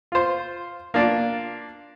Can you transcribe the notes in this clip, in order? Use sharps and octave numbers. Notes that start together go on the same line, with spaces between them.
F4 C5
A#3 D4 F4